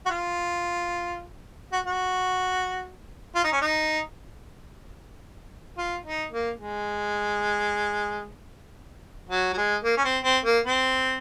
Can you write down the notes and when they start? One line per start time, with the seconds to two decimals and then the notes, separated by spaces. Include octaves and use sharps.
0.06 F#4
0.10 F4
1.72 F#4
1.86 F#4
3.35 F4
3.44 D#4
3.52 C#4
3.61 D#4
5.78 F4
6.06 D#4
6.32 A#3
6.59 G#3
9.29 F#3
9.53 F#3
9.57 G#3
9.84 A#3
9.97 C#4
10.04 C4
10.24 C4
10.45 A#3
10.65 C4